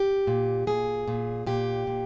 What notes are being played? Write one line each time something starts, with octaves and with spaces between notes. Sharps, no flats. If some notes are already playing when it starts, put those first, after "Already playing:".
Already playing: G4
A#2
A#2 G#4
A#2
A#2 G4
A#2